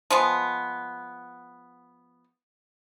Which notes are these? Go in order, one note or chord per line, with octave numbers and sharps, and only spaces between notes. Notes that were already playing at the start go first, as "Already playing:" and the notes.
F3 G#3 B3